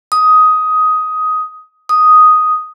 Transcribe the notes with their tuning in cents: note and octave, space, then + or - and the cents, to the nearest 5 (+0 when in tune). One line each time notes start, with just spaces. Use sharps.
D#6 +10
D#6 +0